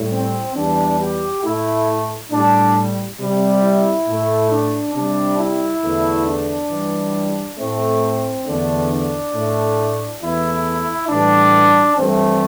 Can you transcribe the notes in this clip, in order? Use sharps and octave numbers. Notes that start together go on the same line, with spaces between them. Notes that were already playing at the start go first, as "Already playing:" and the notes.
Already playing: A2 G3
C4
E2 E3 G3 D4
G4
A2 A3 E4
A2 G3 D4
C3 G3
E4
A2 A3
D4
C3 G3 D4
E4
E2 D3 A3
D4
G2 E3 G3
A2 A3 C4
E2 D3 A3 D4
D4
A2 A3
E2 E3 A3 E4
A2 E3 G3 D4
G2 E3 A3 C4